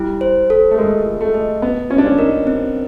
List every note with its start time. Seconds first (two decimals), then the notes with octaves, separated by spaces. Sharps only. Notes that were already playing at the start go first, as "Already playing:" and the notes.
Already playing: G3 E4
0.21 C5
0.50 A4
0.71 A3
0.78 G#3 A#4
1.05 F4
1.21 A3
1.34 D#5
1.62 A3 B3
1.90 C#4 F4
1.98 D4
2.06 C#4
2.18 D#4 A#4
2.47 C4